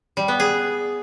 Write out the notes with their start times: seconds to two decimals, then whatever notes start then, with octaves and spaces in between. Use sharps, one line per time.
0.17 G3
0.28 B3
0.40 G#4